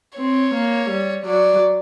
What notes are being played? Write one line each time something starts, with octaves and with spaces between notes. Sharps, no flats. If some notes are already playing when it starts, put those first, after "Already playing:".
C4 C#5
A#3
G3
F#3 D5